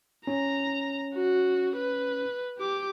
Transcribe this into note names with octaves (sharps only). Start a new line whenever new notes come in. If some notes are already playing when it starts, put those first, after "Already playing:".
C#4 A#5
F#4
B4
G4 D6